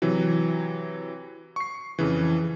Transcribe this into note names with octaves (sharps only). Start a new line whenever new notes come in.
C3 E3 F#3
C#6 C7
F2 C#3 E3